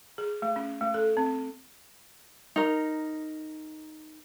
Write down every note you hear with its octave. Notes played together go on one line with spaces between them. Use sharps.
G#4
A3
C#4
A3
A4
C4
D#4 A#4